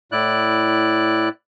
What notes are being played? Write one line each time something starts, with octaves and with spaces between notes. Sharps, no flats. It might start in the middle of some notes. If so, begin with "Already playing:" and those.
A2 E4 D5 F#6